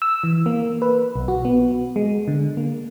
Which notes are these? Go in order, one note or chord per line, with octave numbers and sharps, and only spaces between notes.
E6
E3
A#3
B4
B1
F#4
B3
G#3
D3
A#3